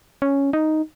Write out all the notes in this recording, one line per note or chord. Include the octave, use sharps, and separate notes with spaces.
C#4
D#4